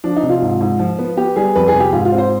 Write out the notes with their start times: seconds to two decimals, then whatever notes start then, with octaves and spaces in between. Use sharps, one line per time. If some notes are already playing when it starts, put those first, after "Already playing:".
0.04 F3 D4
0.16 D#4
0.23 C3
0.29 F4
0.42 G#2
0.61 G#2
0.79 F3
0.99 B3
1.17 B3 G4
1.36 G3 G#4
1.55 F2 B4
1.68 G#4
1.74 C3
1.80 G4
1.93 G#2 F4
2.05 F4
2.12 C4
2.18 C5